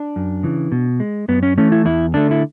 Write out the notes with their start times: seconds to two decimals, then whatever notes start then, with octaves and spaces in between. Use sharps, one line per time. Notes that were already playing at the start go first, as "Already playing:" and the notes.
Already playing: D4
0.16 F#2
0.43 C#3 E3
0.72 B2
1.00 G#3
1.28 F#2 B3
1.43 C#4
1.58 E3 A3 C#4
1.72 E4
1.85 E2 E4
2.14 D3 A3 D4
2.31 E4